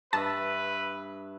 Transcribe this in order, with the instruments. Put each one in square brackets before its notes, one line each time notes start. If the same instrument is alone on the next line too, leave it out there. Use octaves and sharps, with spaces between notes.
[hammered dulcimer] G2 E5 [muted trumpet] B4 [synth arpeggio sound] A5